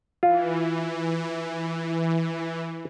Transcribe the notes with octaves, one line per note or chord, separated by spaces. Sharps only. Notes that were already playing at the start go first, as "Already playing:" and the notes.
E3 F4